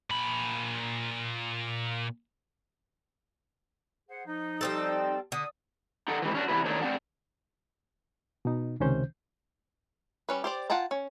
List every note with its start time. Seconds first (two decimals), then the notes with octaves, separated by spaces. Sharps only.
0.10 A#2 B5
4.09 G#4 C5 F#5
4.26 F3 D#4
4.61 G3 C4 A4
5.32 D3 D#6
6.08 D#4 A4 F#5
6.22 G#2 C3 D#3 E3
6.35 C#4 D4 F#4
6.48 C3 E3 G3 B3 E4 B4
6.65 A2 D#3 F#3 D4 D#4 C#5
6.82 C4 D4 D5 F#5
8.45 B2 D#4
8.80 C#2 C3 D#3 C#4 C5 G6
10.29 G3 C#4 B4
10.44 G4 C5 D5
10.70 F4 F#5 G5 A5 A#5
10.91 C#4